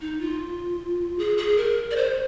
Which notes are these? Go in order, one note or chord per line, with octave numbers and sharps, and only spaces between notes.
D#4
F4
G#4
G#4
A#4
D5
C5